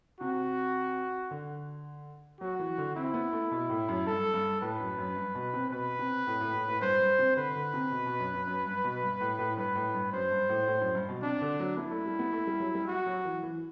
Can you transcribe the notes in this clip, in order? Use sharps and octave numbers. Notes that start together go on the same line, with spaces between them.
C3 F#4
D3
F#3 F#4
E3
D3
C4 E4
B3
A3
B2
A2
F#2
G2 A4
G2
A2 B4
F#2
F#2
G2
B2
C3
B2 B4
C3
A2
A2
A2
A2
G2 C5
G2
C3
D3 B4
D3
C3
B2
B2
F#2
F#2
F#2
G2
B2
G2
A2
A2
G2 B4
A2
G2
F#2 C5
G2
A2
A2
F#2
G2
B2
C3 D4
D3
F#3
B3 E4
A3
G3
B3
A3
G3
F#3
G3
F#4
F#3
E3
E3